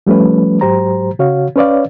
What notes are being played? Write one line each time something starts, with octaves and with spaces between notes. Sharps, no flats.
F3 G3 A3 C#4 B4
G#2 F#3 G4 C5 A#5
C#3 F#4 C#5 F5
C#4 B4 C#5 D5 F5